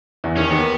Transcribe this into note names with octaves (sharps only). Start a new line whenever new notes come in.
E2 E3
D#2 D#3 C#4
D#2 D#3 B3